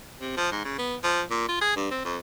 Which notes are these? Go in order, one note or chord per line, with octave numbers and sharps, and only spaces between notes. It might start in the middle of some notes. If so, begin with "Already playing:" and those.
C3
F3
G#2
C#3
B3
F3
A#2
F4
G#4
G2
C4
F2